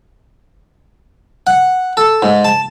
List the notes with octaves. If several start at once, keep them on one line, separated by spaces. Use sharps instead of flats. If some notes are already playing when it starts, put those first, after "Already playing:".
F#5
A4
G#2
A5